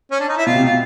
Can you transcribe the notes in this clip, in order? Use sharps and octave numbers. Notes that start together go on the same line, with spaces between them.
C#4
D4
D#4
E4
B2 F4
C3
B2 F4